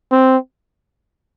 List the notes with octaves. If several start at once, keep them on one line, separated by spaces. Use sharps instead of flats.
C4